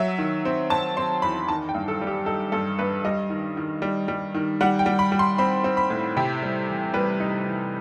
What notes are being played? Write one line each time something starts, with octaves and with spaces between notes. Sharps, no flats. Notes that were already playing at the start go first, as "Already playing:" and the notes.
Already playing: F#3 E5
D#3
C4
C4 A5
C4 C6
E2 B5
D#3 A5
G5
G2
A4
G3
G4
D#4 A4
G2 A4
G2 B4
G3 D#5
D#3
D#3
G3
G3
D#3
G3 F#5
G5
G3
B5
G3
C6
C4 B5
C4
B5
A2
C3 G5
G3
E3
G3 B4
D#4
E3